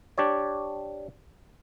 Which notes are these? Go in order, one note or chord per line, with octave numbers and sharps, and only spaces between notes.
D4 G4 C#5 D5